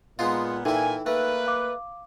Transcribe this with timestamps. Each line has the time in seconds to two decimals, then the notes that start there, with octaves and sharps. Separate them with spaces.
0.19 A#2 G#3 B3 D#4 F4
0.65 A#2 E3 D#4 E4 A4 G5 G#5
1.06 A3 A#3 B4
1.47 F5 D6